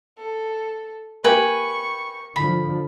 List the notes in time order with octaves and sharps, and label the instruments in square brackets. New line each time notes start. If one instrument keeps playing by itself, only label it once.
[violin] A4
[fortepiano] A#3 G4 [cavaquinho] B4 G5 G#5 [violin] C#6
[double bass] D3 F3 [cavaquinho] B5